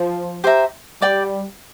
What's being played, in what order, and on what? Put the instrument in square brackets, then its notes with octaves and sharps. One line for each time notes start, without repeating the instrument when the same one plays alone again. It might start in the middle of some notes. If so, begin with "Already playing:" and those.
Already playing: [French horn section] F3
[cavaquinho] G4 C5 E5 A#5
[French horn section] G3 [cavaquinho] D5 G5 D6